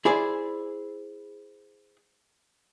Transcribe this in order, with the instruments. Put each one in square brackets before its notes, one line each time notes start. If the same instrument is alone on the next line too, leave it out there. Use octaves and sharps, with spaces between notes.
[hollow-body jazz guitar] E4 G#4 C5 D5